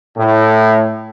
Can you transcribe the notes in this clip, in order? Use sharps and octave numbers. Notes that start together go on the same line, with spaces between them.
A2